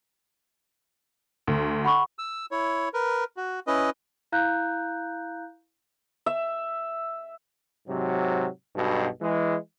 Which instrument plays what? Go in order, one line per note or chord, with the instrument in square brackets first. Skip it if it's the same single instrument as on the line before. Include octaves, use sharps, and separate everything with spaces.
[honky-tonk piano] D2
[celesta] F#5 B5 C#6
[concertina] E6
E4 C#5
A#4 B4
F#4
C#4 E4 B4 D#5
[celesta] E4 F5 A#5 F#6 G6
[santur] E5
[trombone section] G#2 C3 F#3
B1 G2 B2
E3 G#3